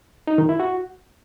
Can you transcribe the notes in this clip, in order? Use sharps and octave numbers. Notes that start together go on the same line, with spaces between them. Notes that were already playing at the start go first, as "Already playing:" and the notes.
D#4
D#3
E4
F#4